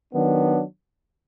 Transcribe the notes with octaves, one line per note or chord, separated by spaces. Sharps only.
D#3 F#3 B3 D4